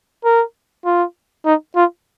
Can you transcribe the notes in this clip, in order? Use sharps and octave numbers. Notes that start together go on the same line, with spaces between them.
A#4
F4
D#4
F4